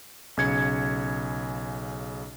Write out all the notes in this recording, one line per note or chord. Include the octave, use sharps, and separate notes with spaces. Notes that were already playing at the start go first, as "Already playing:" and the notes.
B1 C#3 G#6 C#7